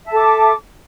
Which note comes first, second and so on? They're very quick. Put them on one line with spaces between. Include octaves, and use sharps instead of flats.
E5 A5 A4 D6